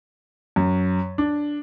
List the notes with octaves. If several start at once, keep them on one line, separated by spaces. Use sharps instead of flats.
F#2
D4